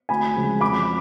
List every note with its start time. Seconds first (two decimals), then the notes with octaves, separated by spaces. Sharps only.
0.09 D2 G#5 B5
0.36 C#3 F3 G#3
0.61 F2 B5 D6